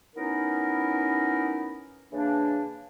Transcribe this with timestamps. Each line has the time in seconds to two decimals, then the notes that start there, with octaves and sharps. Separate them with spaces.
0.16 F#3 B3 C#4 D#4 E4 A#4
2.12 C#3 E3 A#3 D4